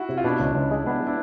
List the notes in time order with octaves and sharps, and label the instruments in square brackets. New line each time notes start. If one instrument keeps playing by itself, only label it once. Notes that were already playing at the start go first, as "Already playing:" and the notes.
Already playing: [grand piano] E4 F#4
[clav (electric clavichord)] C3
[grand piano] F4
[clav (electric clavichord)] B2 [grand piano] D4 E4
[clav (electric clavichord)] C#2
C#2
G#3
[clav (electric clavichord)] B3 [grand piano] D4 E4
[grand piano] D4 E4